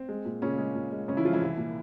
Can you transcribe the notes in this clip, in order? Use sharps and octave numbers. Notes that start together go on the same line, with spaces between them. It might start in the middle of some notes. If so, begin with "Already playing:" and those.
Already playing: C4
G#3
A#2
A#2 C#3 C#4
G#3
A#2
G#3
C#3 G#3 C#4
E3 E4
F3 G#3 F4
E3 E4
C2
A#2